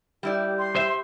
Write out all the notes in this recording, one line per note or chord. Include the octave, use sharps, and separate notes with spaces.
G3 E4 G4 D5
C6
C5 E5